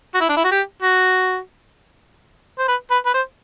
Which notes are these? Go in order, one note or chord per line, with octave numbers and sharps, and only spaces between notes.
F#4
E4
D4
E4
F#4
G4
F#4
C5
B4
B4
B4
C5